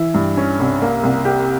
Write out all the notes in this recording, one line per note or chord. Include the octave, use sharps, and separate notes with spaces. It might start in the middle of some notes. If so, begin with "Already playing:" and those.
Already playing: E3 E4
G2
C#4
C2
A#3
C2
G4